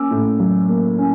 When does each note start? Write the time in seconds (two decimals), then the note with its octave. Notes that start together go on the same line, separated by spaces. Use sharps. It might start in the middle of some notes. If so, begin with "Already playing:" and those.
Already playing: A#3 C#4 D6 E6
0.11 A2
0.39 F#3
0.69 A#3
0.98 C#4